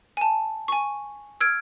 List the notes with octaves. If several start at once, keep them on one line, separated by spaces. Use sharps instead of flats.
G#5 A5
G#5 C#6
E6 F6 G#6 D7